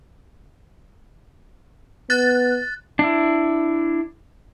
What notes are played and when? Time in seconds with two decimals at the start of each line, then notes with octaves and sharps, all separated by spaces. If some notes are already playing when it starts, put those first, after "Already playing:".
2.10 B3 F#6 A6
2.99 D4 E4